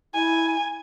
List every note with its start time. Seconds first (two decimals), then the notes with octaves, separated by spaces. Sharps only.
0.14 E4 G#5